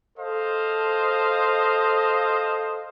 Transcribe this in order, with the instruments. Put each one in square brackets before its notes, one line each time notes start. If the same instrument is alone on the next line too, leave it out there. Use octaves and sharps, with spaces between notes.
[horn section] A4 C5 D#5 F5